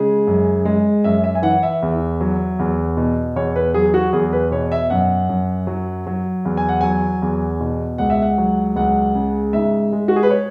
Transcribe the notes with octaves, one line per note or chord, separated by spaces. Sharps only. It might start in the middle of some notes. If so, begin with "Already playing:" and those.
Already playing: C#3 G#3 G#4
F#2
G#3
F#2 E5
E5
G#5
E3 F#5
E5
E2
F#3
E2
B2
E2 C#5
B4
F#3 G#4
F#4
E2 G#4
B4
B2 C#5
E5
F#2 F#5
F#2
F#3
F#3
E2
G#5
F#5
F#3 G#5
E2
B2
C#2 F#5
E5
F#5
F#3
C#2 F#5
C#3
G#2 E5
G#3
F#4
G#4
B4
C#5